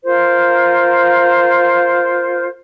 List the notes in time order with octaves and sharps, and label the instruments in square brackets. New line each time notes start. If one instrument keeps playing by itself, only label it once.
[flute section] F4 A#4 C5